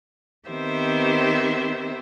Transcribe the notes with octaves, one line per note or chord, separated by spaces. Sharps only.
D#3 B3 C4 G4 C5 E5